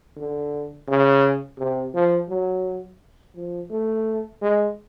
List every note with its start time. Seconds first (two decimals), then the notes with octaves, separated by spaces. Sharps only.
0.17 D3
0.88 C#3
1.58 C3
1.94 F3
2.29 F#3
3.35 F3
3.70 A3
4.41 G#3